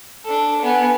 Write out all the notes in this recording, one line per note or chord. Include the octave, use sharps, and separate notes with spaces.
D4 A4
B3 G#5